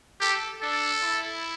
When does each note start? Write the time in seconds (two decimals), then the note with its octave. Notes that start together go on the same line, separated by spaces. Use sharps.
0.21 G4 A4
0.62 D4 A4
1.03 E4